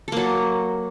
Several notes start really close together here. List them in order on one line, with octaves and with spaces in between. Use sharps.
A4 A#3 F#3